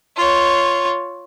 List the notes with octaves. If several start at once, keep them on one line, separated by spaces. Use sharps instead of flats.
F4 C#5